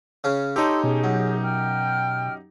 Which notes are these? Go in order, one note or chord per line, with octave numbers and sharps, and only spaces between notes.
C#3 C#4
D#4 G4 A4 C#5 C6 E6
B2 C#4 G#4
F#2
G5 F6